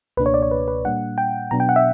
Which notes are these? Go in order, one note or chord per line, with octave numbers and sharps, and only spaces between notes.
C#2 B2 A#3 D4 B4
C#5
D5
C#5
B4
B4
A#2 G3 A#3 D4 F#5
G5
B2 F#3 B3 D4 A#5
G5
F#5
E5